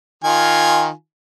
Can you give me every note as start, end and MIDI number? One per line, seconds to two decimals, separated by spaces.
0.24 0.90 51
0.24 0.90 65
0.24 0.90 80